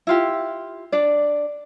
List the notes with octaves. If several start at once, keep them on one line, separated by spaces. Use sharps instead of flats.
E4 F4 G4
D4 D5